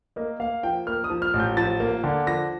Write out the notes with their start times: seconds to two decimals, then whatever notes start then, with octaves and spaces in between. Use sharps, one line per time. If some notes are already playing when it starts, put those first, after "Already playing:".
0.16 A#3 D#5
0.40 A#3 F5
0.63 F3 G5
0.87 A#3 F6
1.04 D#6
1.10 F3
1.22 F6
1.34 A1
1.40 G6
1.57 F3 A6
1.80 A#3
2.04 D3
2.27 F3 A#6